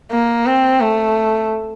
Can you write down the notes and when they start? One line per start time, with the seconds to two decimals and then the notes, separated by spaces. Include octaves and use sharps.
0.11 A#3
0.46 C4
0.81 A3